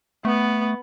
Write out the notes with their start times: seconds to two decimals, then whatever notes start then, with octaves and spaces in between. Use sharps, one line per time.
0.25 A3 B3